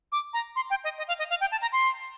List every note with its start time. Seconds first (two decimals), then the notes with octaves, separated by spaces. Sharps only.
0.12 D6
0.33 A#5
0.56 C6
0.70 G5
0.84 D#5
0.98 D#5
1.08 F5
1.19 D#5
1.30 F5
1.41 G5
1.52 A5
1.61 A#5
1.72 C6